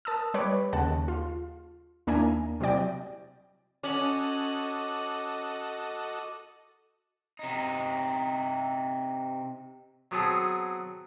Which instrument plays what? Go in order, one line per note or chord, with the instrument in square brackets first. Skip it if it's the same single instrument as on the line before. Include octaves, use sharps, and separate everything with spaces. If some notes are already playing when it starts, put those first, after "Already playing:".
[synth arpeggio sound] A#4 A5 D#6 E6
G3 B4 C#5 B5 D6
D#2 C#3 F#5 A5
F4
D#2 A#3 D4 E4 G#5 A#5
C3 F#3 E4 D5 G5
[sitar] C#4 [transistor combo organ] F#4 A4 D#5 [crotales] D6 F#7
[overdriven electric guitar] C3 D#4
[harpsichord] F#3 B3 C4 G#4 A4